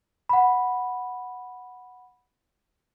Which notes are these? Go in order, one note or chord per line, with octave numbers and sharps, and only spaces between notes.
F#5 B5